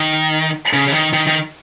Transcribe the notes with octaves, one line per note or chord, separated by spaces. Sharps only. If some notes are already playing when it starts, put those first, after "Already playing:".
Already playing: D#3
C#3
C#3
D#3
D#3
D#3